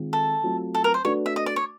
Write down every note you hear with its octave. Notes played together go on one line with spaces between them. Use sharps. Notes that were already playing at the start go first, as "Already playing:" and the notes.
Already playing: D#3 G#3 C4 F4 G#4
A4
F#3 A3 C4 F4
A4
A#4
C5
A3 D4 F#4 B4 C#5
E5
D#5
D5
C#5